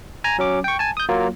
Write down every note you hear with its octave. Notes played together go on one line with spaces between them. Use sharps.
G#5 A#5
F#3 C#4 D6
G5 C#6
G#5 A5
D#6 G6
F#3 A#3 F4